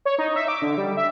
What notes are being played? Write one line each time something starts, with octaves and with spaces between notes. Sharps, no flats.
C#5
D#4
E5
D6
D3
G3
E5